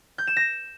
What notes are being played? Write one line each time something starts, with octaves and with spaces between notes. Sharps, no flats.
G6
E7
A#6